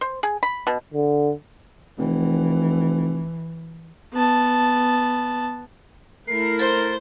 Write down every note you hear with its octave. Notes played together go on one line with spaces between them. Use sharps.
C5
G#4
B5
B2
D3
F1 E3
B3 A5
A3 E4 A#4 C7
C5 A6